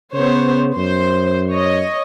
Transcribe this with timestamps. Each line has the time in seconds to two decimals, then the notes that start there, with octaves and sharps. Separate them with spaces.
0.13 C#3 B3 C5 C#5
0.77 F#2 C5
1.50 C#5 D#5